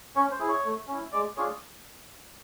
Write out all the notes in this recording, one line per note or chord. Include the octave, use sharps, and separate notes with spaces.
C#4 C#5
C5
E4 G#4
C#5
A3
C#4 E4
G#3 D5
D4 F4 G#4 C#5